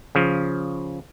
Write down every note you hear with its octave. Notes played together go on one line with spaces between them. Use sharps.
C#3 F3